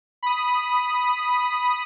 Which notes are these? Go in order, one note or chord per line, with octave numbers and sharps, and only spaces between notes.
B5 D#6